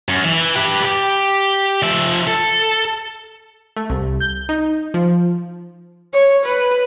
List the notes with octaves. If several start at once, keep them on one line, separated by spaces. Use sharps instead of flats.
F#2
E3
G4 B4
G4
F3 E5
A4
A3
C2
G6
D#4
F3
C#5
B4